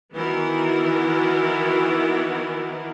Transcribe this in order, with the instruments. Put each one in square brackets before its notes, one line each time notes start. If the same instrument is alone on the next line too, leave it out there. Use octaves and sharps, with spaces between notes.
[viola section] D#3 E3 B3 E4 F#4 A#4